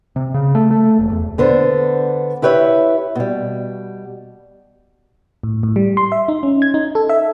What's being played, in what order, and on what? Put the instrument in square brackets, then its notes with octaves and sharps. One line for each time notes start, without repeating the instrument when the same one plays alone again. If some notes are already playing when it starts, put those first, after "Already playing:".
[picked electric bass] C3
C#3
A3
A3
E1
E2
[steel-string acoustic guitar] D3 B3 D4 C5
E4 G4 B4 C#5 D5 E5
B2 G3
[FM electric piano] A2
A2
G3
C6
E5
D#4
C#4
G#6
D#4
A4
E5